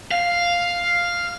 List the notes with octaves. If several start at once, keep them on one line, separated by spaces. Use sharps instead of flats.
F5